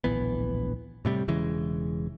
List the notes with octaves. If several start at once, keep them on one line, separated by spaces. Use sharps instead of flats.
D1 A#1 E3 B3
A2 C3 G3
E1 C#3 E3 G#3